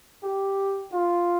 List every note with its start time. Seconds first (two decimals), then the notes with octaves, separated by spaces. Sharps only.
0.23 G4
0.92 F4